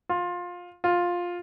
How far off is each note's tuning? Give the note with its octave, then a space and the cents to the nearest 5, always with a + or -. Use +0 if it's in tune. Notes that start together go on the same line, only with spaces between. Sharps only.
F4 +20
F4 +10